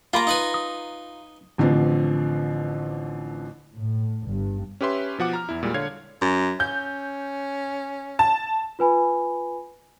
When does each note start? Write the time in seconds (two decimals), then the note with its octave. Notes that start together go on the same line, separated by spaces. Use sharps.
0.13 A#3 F4 F5 A#5 B5
0.27 D#4 B4 G#5
0.54 D#6
1.58 A1 D3 E3 F3 C4
3.76 A2
4.25 G1 G2
4.81 C#4 G4 B4 E5 C6
5.18 B2 F3 F#5 D6
5.33 A#5 F6
5.49 E2 E4
5.63 A#2 G3 G#3
5.74 D3 C#5 F5 G#6
6.21 F#2
6.60 C#4 G6
8.19 A5
8.79 F4 B4 G#5 B5